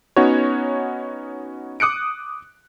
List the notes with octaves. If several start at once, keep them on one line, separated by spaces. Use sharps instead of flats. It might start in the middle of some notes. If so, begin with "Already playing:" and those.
B3 C#4 D#4 F#4 C#5
D6 D#6 F#6 C#7 D7